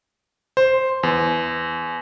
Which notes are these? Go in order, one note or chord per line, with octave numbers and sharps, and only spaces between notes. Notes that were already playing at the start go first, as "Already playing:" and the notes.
C5
E2